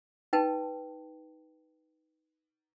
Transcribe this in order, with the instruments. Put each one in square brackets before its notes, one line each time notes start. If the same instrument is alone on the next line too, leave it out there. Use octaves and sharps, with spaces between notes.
[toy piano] D#4 B4 G5 A5